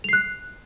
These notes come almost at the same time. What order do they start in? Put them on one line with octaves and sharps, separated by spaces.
F7 C7 F#6